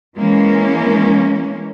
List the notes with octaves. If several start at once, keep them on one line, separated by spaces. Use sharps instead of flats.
E3 G#3 A#3 C#4